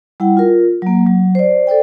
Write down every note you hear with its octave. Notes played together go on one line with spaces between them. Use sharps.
G3 E4 F#5 G5
F4 A#4
F#3 A#3
F#3
C5 D5
A4 C5 D5 G5